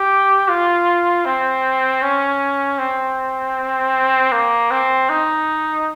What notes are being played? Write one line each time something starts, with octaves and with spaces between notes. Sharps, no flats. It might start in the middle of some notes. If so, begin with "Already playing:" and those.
Already playing: G4
F4
C4
C#4
C4
A#3
C4
D#4